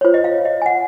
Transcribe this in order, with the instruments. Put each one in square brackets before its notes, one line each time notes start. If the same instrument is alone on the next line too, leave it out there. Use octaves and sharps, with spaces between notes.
[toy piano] F4 C5 C#5
D#5
F5
D#5
G#5
F#5